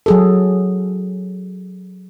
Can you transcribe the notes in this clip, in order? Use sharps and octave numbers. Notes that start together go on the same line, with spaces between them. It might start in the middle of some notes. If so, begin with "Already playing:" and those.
F#3 G#4 A4